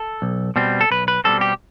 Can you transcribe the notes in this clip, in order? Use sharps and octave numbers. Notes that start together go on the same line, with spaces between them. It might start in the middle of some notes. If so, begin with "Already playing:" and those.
Already playing: A4
B1
B2 G3 C4
A4
B1 B4
B4
B2 G3 C4 A4
G4